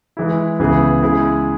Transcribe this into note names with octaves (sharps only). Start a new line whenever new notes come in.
E3 G#3 E4
C#2 C#3 E3 B3 G#4
C#3 G#3 E4 G#4